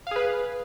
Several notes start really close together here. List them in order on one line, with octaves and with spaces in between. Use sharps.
F5 G#4 B4